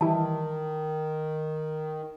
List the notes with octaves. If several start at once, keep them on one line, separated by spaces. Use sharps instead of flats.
D#3 E3 G3 E4 A5